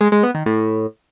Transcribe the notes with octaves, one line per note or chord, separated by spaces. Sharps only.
G#3
G#3
B3
D#3
A2